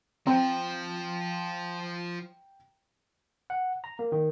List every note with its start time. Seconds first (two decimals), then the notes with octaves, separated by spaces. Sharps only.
0.27 F3 C4 F4 G5 A#5
3.50 F#5
3.84 A#5
3.99 A#3
4.12 D#3